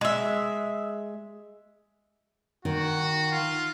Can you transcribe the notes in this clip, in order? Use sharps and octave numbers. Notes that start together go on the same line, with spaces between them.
G#3 E5
D#3 F#4
F4